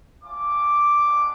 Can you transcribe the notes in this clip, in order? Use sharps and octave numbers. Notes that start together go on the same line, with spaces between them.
A3 C#4 F4 D6
G#3 B3 D4